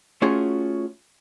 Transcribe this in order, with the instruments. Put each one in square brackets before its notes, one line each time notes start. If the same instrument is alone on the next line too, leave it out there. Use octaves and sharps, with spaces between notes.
[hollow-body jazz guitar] A3 C#4 F4 F#4 G#4 G#5